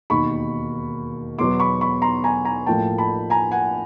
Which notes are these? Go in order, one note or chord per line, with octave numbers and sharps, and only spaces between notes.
E1 D#2 D#3 B5 C#6
E2 B2 F#3 B3 C6 D6
B5 C#6
B5 C#6
A#5 C6
G#5 A#5
G#5 A#5
A1 A2 F3 A#3 G5 A5
A5 B5
G#5 A#5
F#5 G#5